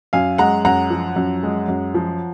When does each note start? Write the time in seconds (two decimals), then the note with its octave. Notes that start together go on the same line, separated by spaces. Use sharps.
0.13 F#2 F5 G#5
0.38 G#3 F#5 A#5
0.65 F#2 F#5 A#5
0.90 F3
1.16 F#2
1.43 G#3
1.68 F#2
1.94 F3